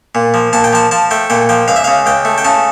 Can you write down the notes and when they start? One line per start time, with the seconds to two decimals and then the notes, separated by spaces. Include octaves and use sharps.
0.15 A#2
0.34 F3
0.53 A#2 A5
0.64 G5
0.73 F3 A5
0.91 F3 A5
1.11 A3 G5
1.30 A#2 G5
1.49 F3 G5
1.68 C#2 F5
1.76 E5
1.84 C#3 F5
2.06 C#2 G5
2.25 A3
2.38 G5
2.44 C#3 A5